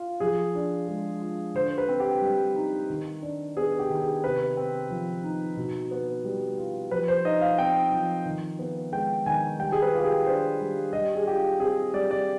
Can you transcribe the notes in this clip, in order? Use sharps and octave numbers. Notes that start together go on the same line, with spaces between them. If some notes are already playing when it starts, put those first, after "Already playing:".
Already playing: F4
F3 G#4
D4
G#3
F4
D3 C5
B4
C4
G4
G3
D#4
D#3
D4
B3 G#4
G4
D#3
G#4
C3 B4
C4
F3
D#4
B2
B3
G3
F4
F3 B4
C5
D#4 D#5
F5
C4 G5
F3
D#3
B3
G#3 G5
D#3 G#5
G3 G5
G#4
B4
F4
G4
G#4
D4 C5
G3
G3 D#5
G#4
F4 G4
C4 G#4
G3 D5
D5